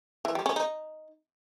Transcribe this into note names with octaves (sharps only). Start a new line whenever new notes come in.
E3
G3
C#4
D#4